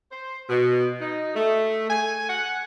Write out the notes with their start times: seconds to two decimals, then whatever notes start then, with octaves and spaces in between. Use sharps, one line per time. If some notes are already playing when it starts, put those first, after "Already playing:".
0.11 C5
0.49 B2
1.01 D#4
1.35 A3
1.89 G#5
2.29 F#5